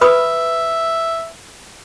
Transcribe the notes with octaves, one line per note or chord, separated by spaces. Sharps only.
B4 E5 B5 D#6